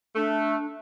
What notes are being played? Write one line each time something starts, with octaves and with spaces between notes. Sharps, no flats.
A3 D4